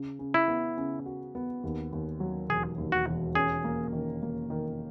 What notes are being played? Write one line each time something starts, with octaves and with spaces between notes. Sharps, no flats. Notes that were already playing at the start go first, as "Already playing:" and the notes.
Already playing: C#3
C#3
E4
B3
C#3
F#4
B3
D#2
D#2
F#3
E1 G#4
D#2
F#4
E1
C#4 G#4
A#3
D#3
A#3
D#3